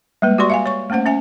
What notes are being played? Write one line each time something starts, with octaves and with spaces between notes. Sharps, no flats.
G3 G#3 A#3 B4
F#4 G4 D5 C6 C#6
E5 F5 G#5
C#5 C#6
A3 A#3 C#4 C5 F#5
C#4 E5 G#5